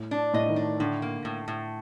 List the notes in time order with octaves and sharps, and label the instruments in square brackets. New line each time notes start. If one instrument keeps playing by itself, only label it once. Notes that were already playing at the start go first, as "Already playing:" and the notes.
Already playing: [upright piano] A2
[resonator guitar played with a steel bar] D4
[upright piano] A2 [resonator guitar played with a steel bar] D#5
[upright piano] D#3
[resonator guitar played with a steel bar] D4
[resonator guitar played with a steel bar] A2 [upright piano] D3
[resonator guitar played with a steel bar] A#3
A2
A2